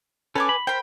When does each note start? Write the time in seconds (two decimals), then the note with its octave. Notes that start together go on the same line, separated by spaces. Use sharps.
0.35 C#4 A4 B4 G#5 D6
0.49 B5
0.67 A#4 C5 G5 B5